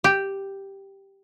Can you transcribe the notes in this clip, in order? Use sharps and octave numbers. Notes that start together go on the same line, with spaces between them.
G4